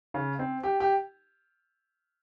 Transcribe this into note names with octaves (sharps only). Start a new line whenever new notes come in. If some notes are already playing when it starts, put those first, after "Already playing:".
C#3
C4
G4
G4